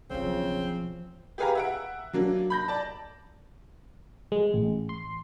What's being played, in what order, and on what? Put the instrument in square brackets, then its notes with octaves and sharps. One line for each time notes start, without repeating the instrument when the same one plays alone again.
[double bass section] B1 [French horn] C#3 [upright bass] E3 F3 [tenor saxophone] C4
[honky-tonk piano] G4 G#4 B4 F5 G#5 A#5
E5 F#5 D7
F#3 A#3 D4
B5 G6 A#6
D5 A5
[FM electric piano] G#3
A1
C6